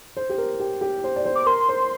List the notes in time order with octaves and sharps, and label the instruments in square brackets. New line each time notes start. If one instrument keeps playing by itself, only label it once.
[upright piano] C5
G4
A#4
G4
G4
C5
D5
C5
[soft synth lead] D6
[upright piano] A#4 [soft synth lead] C6
[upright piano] C5